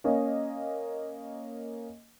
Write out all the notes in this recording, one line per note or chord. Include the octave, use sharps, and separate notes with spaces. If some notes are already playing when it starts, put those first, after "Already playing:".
A#3 C#4 D#5